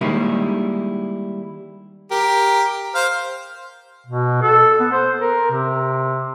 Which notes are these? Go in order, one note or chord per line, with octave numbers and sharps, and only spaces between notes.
D#3 G3 G#3 A#3 D#4 E4
G4 A#4
C5 F5
B2
A4
B3
C5
A#4
C3